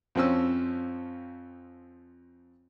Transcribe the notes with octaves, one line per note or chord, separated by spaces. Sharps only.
F2 F3 C4 C#4 E6